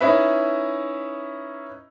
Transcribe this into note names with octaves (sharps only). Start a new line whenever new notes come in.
C#4 D#4 E4 B4 E5